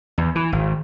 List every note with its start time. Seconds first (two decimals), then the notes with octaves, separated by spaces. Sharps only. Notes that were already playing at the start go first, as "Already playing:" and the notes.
0.18 E2
0.35 E3
0.52 G#1